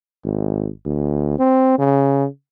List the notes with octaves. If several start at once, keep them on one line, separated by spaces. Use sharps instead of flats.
G#1
D2
C4
C#3